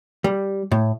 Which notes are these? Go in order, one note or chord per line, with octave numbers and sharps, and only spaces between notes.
G3
A2